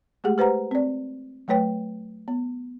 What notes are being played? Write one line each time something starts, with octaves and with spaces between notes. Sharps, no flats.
G#3 A3 G4 G#4 F#5
G4 B4 C5 F#5 A#5
C4 D5
F#3 A3 B4 C#5 G5
B3